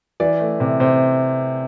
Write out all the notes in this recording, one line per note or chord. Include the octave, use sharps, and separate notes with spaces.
E3 D5
A3
C3
C3 C5